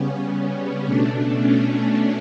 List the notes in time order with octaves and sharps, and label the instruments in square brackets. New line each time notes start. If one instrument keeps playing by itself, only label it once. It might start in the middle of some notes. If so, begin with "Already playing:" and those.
Already playing: [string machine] C#3 G3 B3 C#4
C#4
B2 A3 D4
C#4